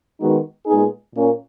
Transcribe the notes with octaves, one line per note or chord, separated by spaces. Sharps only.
D#3 G#3 B3 D#4 F#4
A#2 G#3 B3 D#4 G#4
A#2 A#3 C#4